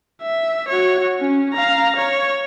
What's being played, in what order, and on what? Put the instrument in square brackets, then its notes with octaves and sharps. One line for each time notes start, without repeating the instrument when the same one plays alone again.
[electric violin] E5
F#4 C#5
C#4
F5 A#5
C#5